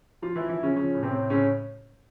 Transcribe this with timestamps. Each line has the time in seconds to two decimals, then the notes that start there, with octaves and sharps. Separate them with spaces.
0.22 F3 F4
0.36 E3 F3 E4
0.49 E3 E4
0.59 C#3 F3 C#4
0.76 C#3 F3 C#4
0.94 A2
1.03 C3 C4
1.12 A2
1.30 A2 C#3 C#4